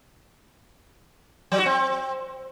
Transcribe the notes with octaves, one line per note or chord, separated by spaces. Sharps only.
F#3
F#4
C4